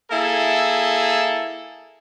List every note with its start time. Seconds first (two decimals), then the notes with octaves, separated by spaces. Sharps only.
0.10 A#3 E4 G#4 A4